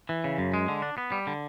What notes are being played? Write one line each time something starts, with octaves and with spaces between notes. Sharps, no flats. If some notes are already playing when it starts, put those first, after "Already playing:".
E3
C#3
F#2
G#3
D3
D4
B3
G3
D3